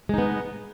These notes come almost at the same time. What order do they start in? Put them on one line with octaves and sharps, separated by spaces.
G#3 D#4 B3